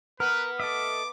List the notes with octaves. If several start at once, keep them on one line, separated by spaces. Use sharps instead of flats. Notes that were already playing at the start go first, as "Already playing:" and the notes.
B3 A#4 B4 F6
A4 D#5 E5 D6